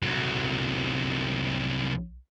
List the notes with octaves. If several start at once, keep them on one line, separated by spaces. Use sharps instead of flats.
C2 F#3